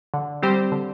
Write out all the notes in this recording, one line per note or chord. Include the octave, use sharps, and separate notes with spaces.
D3
G3 C4 G4 C5
D3